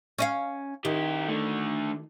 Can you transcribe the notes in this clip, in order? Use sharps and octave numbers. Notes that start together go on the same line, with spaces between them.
C#4 D#5 F5
D#3 E4 G4
D3 A3